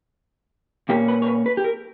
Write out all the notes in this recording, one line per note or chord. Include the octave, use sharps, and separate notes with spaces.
A#2 A#3 C#4 G4
B4
C#5
B4
B4
G4
A#4